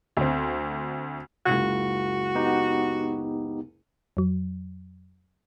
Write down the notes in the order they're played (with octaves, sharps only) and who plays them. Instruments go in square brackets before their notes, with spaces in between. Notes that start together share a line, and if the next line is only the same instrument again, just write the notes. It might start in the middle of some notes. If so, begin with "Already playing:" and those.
[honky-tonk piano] D2 C4
[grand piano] F#1 C#2 [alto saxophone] F#4
[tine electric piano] B3 D#4 G4
[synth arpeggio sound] F2 F#3